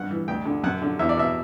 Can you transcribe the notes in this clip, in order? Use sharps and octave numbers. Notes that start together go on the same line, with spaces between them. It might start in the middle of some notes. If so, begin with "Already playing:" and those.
Already playing: G2 F#5
E3
D2 G5
D3
F#2 F#5
D3
E2 E5
D5
B2 E5